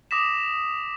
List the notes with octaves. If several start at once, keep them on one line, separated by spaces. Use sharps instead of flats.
D6 D#6 A#6 B6 E7